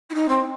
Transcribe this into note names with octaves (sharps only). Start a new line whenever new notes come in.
E4
D#4
C4